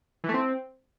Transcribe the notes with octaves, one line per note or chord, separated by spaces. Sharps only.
E3
A3
C4